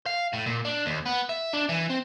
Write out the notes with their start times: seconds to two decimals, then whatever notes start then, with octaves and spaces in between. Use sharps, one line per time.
0.06 F5
0.33 A2
0.46 A#2
0.65 D4
0.86 D#2
1.06 B3
1.29 E5
1.53 D4
1.69 E3
1.90 C4